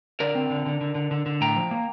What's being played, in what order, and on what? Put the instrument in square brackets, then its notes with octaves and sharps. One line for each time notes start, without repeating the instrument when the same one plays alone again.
[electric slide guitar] D3 A#4 D5
C4
D3
D3
D3
D3
D3
D3
A2 G5 A#5
F3
A#3